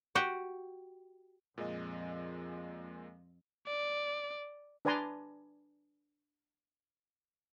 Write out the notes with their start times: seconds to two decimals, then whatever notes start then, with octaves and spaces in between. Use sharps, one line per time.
0.15 F#4 G4 G5
1.58 F2 A#2 G#3 D#5
3.67 D5
4.85 D4 B4 D5 G#5 A#5 C6